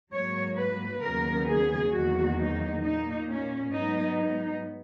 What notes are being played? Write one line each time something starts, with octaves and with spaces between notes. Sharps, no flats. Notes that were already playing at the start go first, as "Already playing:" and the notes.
G#2 F#3 A#3 C#5
B4
D#2 C#3 F#3 B3 A#4
G#4
E2 D#3 F#3 A#3 F#4
D#4
A#2 A#3 D#4
C#4
G#2 F#3 B3 D#4
D#4